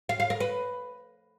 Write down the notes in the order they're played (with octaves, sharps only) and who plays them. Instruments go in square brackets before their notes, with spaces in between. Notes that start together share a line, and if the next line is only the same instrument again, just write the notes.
[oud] F5
F5
A#4
B4